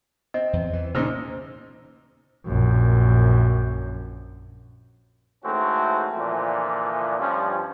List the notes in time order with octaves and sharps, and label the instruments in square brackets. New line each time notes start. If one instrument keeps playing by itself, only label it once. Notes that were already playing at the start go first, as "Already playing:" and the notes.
[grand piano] C4 [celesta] D#5
[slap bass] E2
E3
[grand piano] A#2 D#4 E6 [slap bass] C#3 C#4 [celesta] C5
[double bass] A#1 F#2
[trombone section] G#2 E3 A3 C4 C#4 F#4
A#2 D3 E3 F3
G2 F3 C#4